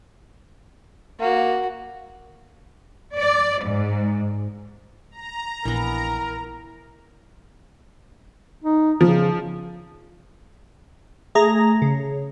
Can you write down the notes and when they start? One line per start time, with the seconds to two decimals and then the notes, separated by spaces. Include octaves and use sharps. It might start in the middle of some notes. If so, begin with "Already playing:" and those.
1.20 A#3 F#4
3.16 D5
3.65 G#2
5.11 A#5
5.65 A#1 E3 B3 A#4
8.64 D#4
9.01 C#3 F3
11.35 A3 G#4 A#5 A#6
11.82 C#3